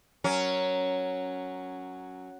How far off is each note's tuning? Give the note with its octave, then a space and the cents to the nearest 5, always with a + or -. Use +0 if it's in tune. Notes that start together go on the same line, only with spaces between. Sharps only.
F#3 +0 C#4 +0 A#4 +0